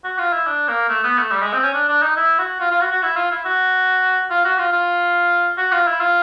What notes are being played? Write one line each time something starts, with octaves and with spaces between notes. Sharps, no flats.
F#4
F4
E4
D4
A#3
A3
B3
A3
G3
G#3
C4
C#4
D4
D4
D#4
E4
F#4
F4
F4
F#4
F#4
E4
F4
E4
F#4
F4
F#4
F4
F4
F#4
F4
E4
F4